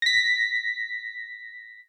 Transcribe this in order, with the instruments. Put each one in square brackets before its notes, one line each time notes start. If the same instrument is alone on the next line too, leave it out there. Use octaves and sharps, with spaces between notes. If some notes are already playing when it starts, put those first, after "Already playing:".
[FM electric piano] A#6 B6